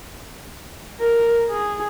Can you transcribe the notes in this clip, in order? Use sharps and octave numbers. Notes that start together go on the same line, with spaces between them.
A#4
G#4